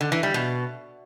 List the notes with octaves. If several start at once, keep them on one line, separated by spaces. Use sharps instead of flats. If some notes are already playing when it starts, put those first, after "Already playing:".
D3
E3
G3
B2